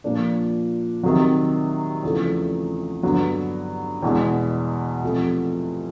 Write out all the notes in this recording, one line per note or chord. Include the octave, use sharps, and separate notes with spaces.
A#2 F3 A#3 D4
C3 D#3 F#3
E2 C#3 F3 A3
G2 D3 F#3 B3
E2 B2 G#3
C3 F3 A3